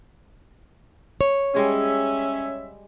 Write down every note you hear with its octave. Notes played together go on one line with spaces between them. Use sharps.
C#5
G3 G#3 C#4 G#4 E5